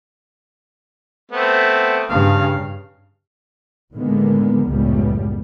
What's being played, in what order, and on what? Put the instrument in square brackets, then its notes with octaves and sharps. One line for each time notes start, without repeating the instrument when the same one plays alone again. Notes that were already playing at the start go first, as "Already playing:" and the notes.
[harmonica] A3 B3 C4
[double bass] G2 C#3 [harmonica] F5
[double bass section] A2 D3 D#3 G#3 A#3 B3
F#1 C#2 A2 G3 B3